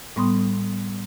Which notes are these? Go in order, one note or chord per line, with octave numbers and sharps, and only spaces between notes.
A2 G3 B3 C6 D#6